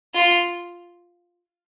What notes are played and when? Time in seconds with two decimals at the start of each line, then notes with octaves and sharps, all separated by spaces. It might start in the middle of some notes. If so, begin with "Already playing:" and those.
0.15 F4